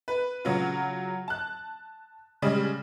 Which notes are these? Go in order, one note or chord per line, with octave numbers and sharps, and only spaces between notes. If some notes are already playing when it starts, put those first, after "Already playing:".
B4
C#3 F#3 F4
A5 F#6
C#3 G3 G#3